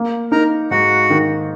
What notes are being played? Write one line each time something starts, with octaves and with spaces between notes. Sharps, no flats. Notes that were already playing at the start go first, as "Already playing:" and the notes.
Already playing: A#3
D#4 A#4 A#5
G#2 F#4 F#5
D#3